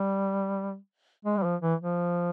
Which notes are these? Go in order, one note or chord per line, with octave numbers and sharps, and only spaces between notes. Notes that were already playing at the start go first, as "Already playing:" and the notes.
Already playing: G3
G#3
G3
F3
E3
F3